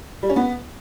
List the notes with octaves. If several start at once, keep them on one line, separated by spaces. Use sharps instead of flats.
G3
C#4
B3